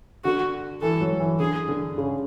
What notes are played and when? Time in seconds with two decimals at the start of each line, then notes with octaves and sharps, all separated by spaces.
0.24 D3 F#4
0.82 E3 A4
1.01 F#3
1.20 E3
1.40 D3 G#4
1.69 D3
1.98 C#3